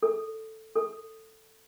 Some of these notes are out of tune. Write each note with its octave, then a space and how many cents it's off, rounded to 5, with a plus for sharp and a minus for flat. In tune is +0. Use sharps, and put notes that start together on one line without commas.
A4 +5
A4 +10